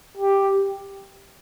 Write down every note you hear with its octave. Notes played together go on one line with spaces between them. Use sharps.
G4